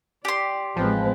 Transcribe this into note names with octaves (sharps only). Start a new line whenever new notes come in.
G4 D5 C6
A1 F3 G#3 C4 B4